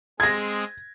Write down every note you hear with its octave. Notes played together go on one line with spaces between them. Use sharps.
G#3 C4 G#4 G#6 A#6